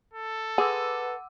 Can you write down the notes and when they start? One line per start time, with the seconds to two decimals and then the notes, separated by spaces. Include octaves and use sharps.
0.14 A4
0.58 G#4 B4 F#5 D6 E6